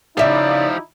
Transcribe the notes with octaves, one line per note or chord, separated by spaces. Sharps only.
C#3 F3 D#4 E4 G4 D5 E5 F5